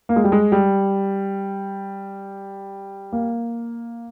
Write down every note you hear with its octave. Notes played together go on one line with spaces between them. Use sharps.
A#3
G#3
G3
G#3
G3
A#3